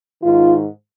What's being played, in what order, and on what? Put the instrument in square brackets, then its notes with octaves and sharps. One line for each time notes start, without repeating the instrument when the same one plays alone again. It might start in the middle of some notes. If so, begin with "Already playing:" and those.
[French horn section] G#2 D#3 F4